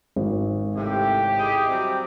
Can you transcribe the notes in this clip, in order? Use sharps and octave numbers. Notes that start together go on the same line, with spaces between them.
G#1
A2 C3 G4
E4 G#4 D#5
F#3 G3 C4